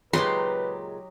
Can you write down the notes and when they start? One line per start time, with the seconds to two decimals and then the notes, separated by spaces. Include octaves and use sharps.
0.13 A#2 C#3 F#3 G#3 D#4 G4 B4 C6